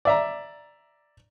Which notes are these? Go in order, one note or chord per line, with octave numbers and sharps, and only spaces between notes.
D5 E5 A#5